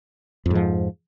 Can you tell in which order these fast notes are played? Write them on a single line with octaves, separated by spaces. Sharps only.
F2 G#2 F3